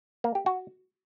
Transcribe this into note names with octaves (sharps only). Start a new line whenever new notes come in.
A#3
G4
F#4